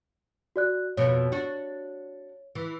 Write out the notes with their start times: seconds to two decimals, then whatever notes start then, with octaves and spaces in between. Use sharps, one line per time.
0.56 F#4 D5 F#6
0.97 F2 B2 C#5
1.32 D4 F#4
2.55 E3